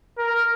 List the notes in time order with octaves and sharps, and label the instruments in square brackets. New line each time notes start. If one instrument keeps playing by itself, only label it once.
[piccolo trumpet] A#4